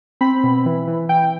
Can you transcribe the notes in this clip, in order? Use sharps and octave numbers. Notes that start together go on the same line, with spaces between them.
C4 B5
B2
E3
E3
E3 G5